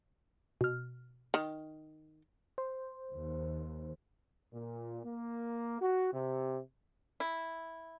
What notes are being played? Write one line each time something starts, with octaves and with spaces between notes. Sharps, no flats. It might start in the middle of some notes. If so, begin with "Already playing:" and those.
B2 F6
D#3
C5
D#2
A#2
A#3
F#4
C3
E4